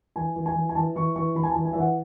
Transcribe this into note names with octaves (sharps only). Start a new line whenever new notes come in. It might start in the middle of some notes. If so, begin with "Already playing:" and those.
E3 G#5
E3
G#5
E3
G#5
E3 A5
E3 C#6
E3 C#6
E3 B5
G#5
A5
E3
G#5
E5
E3 F#5